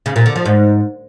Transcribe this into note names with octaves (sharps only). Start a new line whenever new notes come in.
C#3
A#2
D3
F3
G#2